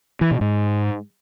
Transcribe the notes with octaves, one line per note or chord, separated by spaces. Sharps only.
E3
B2
G#2